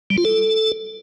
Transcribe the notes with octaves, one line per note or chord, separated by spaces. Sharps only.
G3
F4
A4